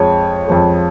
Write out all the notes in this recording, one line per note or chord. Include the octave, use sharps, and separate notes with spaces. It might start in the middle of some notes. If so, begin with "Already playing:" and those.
Already playing: F2 F3 G#3 C#5
F2 F3 G#3